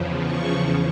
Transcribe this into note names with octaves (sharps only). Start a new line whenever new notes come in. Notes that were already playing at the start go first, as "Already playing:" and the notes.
Already playing: E2 C#3 F3
C#6